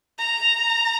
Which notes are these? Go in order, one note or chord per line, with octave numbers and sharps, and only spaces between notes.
A#5